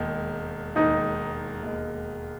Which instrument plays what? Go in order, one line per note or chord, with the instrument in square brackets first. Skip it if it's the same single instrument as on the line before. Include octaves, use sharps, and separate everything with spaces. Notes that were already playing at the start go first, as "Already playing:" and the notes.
Already playing: [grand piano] E1 D#2 D#3 G#3
[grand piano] E1 D#2 D#3 G#3 [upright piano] D#4
[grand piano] E1 D#2 D#3 G#3